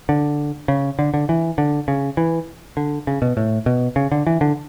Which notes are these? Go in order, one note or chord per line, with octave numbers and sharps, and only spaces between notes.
D3
C#3
D3
D3
E3
D3
C#3
E3
D3
C#3
B2
A2
B2
C#3
D3
E3
D3